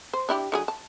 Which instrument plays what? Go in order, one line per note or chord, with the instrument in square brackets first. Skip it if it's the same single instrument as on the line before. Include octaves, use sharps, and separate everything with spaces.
[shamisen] C5
D4 E4 G4
D3 F#3 G#4
A5